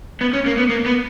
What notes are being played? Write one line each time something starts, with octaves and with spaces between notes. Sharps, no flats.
B3
C#4
A#3
B3
A#3
B3